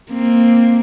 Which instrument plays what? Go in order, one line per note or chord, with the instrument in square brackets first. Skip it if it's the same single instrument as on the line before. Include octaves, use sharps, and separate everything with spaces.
[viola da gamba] A#3 C4